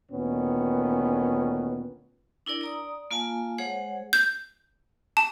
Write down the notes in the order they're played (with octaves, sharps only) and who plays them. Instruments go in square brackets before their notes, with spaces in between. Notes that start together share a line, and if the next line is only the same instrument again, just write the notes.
[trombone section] D2 A#2 D#3 B3 C#4
[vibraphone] D4 E4 A#4 D5
D5 A#5 D#6
A#3 F4 F5 G#5 A5
G#3 G#4 C5 C#5 F#5
[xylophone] G6
A5